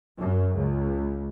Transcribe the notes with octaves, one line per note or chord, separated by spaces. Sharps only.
F#2
C#2